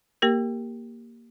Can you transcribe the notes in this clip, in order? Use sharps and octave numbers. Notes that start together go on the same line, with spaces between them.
A#3 G4 A#4